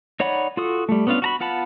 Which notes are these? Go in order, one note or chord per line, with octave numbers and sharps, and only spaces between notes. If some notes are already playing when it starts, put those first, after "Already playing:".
D#4 C#5 D5 F#5 B5
F4 F#4 A4 D#6
G3 A3
B3 C#4 D4 F4 F5
F#4 A#5 B5
B3 F4 F#5 A5 B5